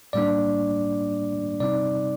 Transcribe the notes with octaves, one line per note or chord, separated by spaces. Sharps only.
A2 G3 A#3 D4 D5
C3 G3 C4 D#4 D5